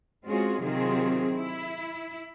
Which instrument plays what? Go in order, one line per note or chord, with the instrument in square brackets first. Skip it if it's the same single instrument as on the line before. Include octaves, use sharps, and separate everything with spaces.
[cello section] G#3 C4 C#4 F4 F#4 G#4
C3 D#3 F#3 C4 F4 G#4
E4